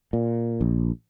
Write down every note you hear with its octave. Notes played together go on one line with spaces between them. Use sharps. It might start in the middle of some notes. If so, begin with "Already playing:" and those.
A#2
A#1